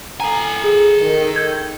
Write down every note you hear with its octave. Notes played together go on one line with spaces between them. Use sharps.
A4 G#5 A#5
G#4
D#3
G6 G#6